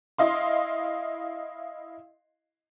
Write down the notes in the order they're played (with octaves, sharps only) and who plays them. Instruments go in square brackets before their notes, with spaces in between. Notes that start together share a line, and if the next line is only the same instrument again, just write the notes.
[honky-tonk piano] E4 D#5 F5 C6